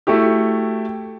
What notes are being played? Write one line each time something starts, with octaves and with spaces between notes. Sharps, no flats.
A3 E4 F#4 G4